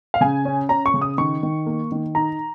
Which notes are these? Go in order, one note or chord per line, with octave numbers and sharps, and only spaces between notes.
F5
C#3 G#5
C#4
C#4 A#5
C#6
C#3
D#6
D#3 C#6
D#3
A#3
D#3
D#4 A#5